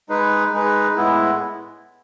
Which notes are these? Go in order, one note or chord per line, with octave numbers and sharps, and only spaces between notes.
G#3 D#4 G#4 B4
G#3 D#4 G#4 B4
A2 G#3 B3 E4